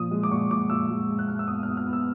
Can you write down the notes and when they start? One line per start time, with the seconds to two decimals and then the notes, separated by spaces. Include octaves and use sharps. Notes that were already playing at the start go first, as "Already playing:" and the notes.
Already playing: A#2 F3 D#6
0.11 G#3
0.23 D6
0.31 A#2 C#6
0.50 A#2 D6
0.70 A#2 E6
0.90 G#3
1.09 G#3
1.19 F#6
1.28 A#2 F6
1.39 E6
1.48 B3 D#6
1.63 F6
1.68 B3
1.77 F6
1.87 B3
1.93 E6